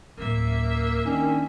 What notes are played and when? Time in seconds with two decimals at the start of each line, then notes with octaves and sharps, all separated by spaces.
0.18 D1 A#3 C#4 E5
1.06 D#3 C#4 D4